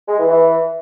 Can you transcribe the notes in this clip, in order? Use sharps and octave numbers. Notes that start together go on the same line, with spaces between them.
G#3
E3
E3